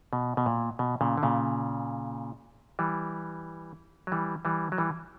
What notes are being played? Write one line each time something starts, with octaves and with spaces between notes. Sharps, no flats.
B2
B2
A#2
B2
A#2 C#3
D3
A#2 C#3
E3 G3
F#3
E3 G3
E3 G3
F#3
E3 G3